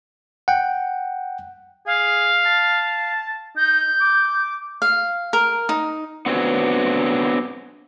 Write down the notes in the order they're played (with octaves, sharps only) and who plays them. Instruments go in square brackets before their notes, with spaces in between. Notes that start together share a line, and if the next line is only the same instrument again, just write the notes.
[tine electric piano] F#5 G5
[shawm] G#4 [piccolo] F5
[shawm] A5
[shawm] D#4 [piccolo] G6
[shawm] D6
[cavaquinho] F5
A#4
D#4
[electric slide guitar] B3 C4 D4 F#4 B4 C#5